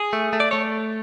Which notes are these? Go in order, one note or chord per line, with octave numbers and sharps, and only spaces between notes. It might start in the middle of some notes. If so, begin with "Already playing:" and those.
Already playing: G#4
A3
A3
D5
A3 C#5